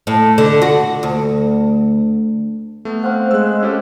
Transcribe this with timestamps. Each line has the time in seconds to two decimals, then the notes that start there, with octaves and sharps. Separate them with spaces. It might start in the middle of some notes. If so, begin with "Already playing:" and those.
0.07 A2
0.38 D3
0.62 F#4
1.03 D2
2.85 A3 B3
3.03 C4 C5 F5 F#5
3.31 G#3 E6 F#6
3.62 C#4 G4 A4